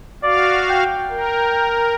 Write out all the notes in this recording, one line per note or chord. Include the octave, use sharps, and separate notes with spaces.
F#4 D5 F5
G5
A#4